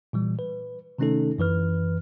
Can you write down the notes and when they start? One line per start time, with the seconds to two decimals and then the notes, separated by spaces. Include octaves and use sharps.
0.13 A#2 E3 G3
0.39 B4
0.99 C3 D#3 A3 C#4 D#4 A4
1.38 F#2 E3 B4 F6